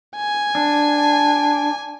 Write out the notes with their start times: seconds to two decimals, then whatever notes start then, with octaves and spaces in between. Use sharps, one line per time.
0.16 G#5
0.55 D4